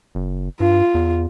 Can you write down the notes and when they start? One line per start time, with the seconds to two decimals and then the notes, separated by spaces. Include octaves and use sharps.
0.15 F#1
0.60 G2 F4
0.95 E2